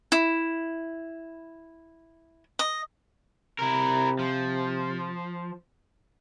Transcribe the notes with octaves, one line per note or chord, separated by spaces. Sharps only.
E4
D#5
C3 E4 A#4
F3